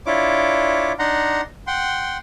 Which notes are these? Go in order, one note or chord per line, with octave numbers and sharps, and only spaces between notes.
D4 E4 F4 C#5 D6
D4 D#4 F#5 A#5 C6
F#5 G5 C6